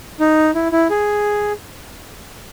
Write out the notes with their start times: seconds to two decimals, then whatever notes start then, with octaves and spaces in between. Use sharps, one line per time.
0.20 D#4
0.55 E4
0.72 E4
0.90 G#4